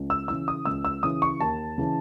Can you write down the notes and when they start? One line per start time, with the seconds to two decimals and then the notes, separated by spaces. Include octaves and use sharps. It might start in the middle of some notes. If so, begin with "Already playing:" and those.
Already playing: C#2
0.10 E6
0.28 C#3 E3 E6
0.48 D#6
0.65 C#2 E6
0.85 E6
1.03 C#3 E3 D#6
1.22 C#6
1.40 D#2 A5
1.78 C#3 E3